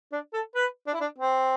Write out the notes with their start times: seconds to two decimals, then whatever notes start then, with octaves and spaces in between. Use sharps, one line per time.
0.12 D4
0.34 A4
0.55 B4
0.87 D4
0.94 E4
1.01 D4
1.18 C4